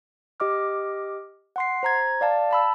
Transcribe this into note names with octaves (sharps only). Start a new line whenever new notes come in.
G4 D#5 D6 F6
F#5 C6 C7
C5 A#5 G#6
D5 F5 A5
A5 B5 E6